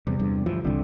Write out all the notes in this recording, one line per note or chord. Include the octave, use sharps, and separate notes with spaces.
E2 C3 G3
E2 G2
D2 G2 E3 F3
F#1 C2 D3 G3 C4